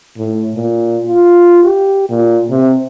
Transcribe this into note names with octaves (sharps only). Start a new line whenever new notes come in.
A2
A#2
F4
G4
A#2
C3